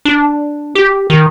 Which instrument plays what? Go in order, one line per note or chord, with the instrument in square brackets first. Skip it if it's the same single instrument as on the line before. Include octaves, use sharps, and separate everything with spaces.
[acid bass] D4
G4
D#3